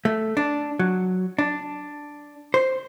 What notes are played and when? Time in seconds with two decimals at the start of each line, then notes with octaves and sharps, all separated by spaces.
0.05 A3
0.37 D4
0.79 F#3
1.39 D4
2.54 C5